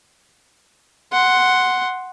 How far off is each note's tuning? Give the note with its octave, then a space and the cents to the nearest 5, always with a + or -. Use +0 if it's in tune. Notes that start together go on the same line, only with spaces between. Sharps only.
F#5 +0 C6 +0